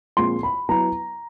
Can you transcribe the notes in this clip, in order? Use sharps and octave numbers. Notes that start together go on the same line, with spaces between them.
A#2 F3 G#3 C4 F4 C6
B5
F#3 B3 E4 A#5